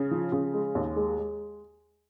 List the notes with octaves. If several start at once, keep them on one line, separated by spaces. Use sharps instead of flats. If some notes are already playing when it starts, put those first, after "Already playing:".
Already playing: C#3
F3
C#3
G#3
D#2
G#3
G#3